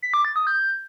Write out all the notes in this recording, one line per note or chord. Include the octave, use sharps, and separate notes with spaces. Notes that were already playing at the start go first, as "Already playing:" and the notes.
B6
D6
A6
D#6
G6